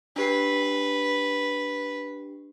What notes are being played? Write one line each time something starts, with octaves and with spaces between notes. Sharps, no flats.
D4 G4 B4 C7